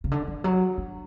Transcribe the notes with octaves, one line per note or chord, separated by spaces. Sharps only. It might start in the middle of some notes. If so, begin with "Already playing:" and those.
C#3
D3
E3
F#3
D4